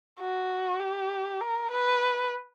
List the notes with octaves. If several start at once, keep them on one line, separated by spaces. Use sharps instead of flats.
F#4
G4
A#4
B4